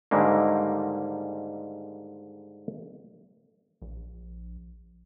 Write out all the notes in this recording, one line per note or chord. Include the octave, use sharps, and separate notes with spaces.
G#2 D3 D#3 G3 G#3 A#3
A#1